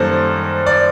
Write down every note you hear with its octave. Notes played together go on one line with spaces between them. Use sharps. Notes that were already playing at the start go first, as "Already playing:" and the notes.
Already playing: F#2 D#3 G3 A#3 A4 C5
D5